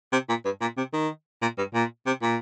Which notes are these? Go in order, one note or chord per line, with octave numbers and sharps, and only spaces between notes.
C3
A#2
G2
A#2
C3
D#3
A#2
G2
A#2
C3
A#2